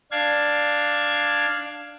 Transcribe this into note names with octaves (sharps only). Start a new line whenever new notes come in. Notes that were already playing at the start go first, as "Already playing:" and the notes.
D4 F5 G#6